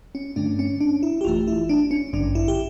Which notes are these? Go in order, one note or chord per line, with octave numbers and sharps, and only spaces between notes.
C#4
G2 D3 A3 D4
C#4
D4
E4
G4
G1 F2 E3 A3 F4
E4
D4
C#4
A1 G2 D3 D4
E4
G4